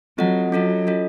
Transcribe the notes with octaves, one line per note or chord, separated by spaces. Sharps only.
F#3 C4 F4 A4 D#5 F#5
F#3 C#4 F4 A4 D#5
C#4 F4 A4 D#5